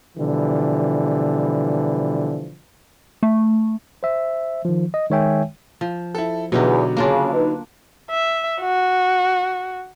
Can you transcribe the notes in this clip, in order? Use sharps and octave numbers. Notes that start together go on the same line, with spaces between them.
B2 D3 E3 F3 G3
A3
C5 E5
D#3 F3
D#5
D#3 G#3 C#5 E5 G5 G#5
F3
E4 A4
E2 B2 D3 F#3 D#4 G4
C#3 A#3 D4 F4
D#4 B4
E5
F#4